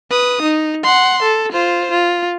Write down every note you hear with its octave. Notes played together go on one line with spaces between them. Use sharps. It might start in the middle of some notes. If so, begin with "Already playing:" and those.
B4 D#6
D#4
F#5 C6
A4
F4 C5
F4